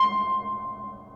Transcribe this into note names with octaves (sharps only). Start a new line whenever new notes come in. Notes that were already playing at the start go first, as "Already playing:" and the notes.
Already playing: C6